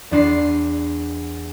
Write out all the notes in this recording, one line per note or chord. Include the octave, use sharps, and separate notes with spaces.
E2 D4 C6 C7